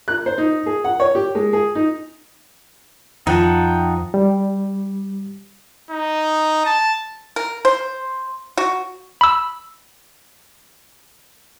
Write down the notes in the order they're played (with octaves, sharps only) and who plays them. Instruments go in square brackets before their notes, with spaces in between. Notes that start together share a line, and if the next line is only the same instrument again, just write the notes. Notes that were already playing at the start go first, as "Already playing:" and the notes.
[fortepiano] F#6
C5
D#4
G#4
F#5
C#5
G4
G#3
G#4
D#4
[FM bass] F2 [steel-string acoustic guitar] F3 [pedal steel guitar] D#4 F#5 A5 [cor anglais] G5
[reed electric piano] G3
[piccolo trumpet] D#4
A5
[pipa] A#4
C5
F#4
[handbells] B5 E6